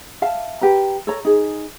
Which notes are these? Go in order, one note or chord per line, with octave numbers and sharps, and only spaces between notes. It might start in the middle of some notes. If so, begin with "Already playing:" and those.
E5 F5 A5
G4 B4 A#5
A4 C#5 A#5
D#4 G#4